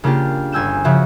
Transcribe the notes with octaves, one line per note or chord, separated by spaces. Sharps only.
C#3 A#3 D4 F4 G4
G1 G#5 E6 G6 E7
C#3 F3 F#4 E5